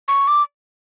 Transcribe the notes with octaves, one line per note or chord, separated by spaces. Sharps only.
C#6
D6